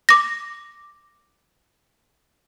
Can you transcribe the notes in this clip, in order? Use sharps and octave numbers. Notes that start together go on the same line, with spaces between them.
D6 A#6